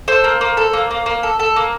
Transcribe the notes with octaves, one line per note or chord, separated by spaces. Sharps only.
A4 C5
A#3
A#3
A4
A#3
A#3
A#3
A4
A4
A#3